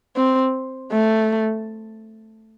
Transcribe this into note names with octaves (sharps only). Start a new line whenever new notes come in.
C4
A3